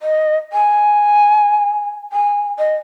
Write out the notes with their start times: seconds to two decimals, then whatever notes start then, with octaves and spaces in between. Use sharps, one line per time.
0.01 D#5
0.53 G#5
2.13 G#5
2.59 D#5